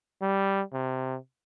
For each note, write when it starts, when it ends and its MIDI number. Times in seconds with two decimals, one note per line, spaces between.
0.22 0.61 55
0.73 1.16 48